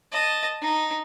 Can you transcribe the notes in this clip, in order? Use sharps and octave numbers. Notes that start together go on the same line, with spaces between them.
D#5 A5
D#4